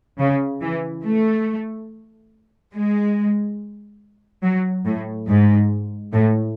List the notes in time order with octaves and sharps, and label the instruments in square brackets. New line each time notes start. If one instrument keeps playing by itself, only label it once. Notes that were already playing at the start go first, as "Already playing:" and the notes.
[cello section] C#3
E3
A3
G#3
F#3
A2
G#2
A2